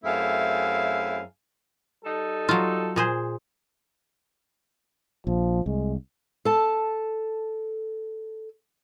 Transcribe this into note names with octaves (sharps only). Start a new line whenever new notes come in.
F#2 A3 C4 E4 G#4 F5
G3 D#4 A4
F#3 F4
A#2 G#4 C5
A#1 F3
C2 G#3
A4 A5